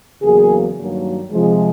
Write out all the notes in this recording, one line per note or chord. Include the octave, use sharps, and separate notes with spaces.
E2 C#3 F#3 A#3 G#4
G2 D#3 F#3 A#3
C3 F3 G#3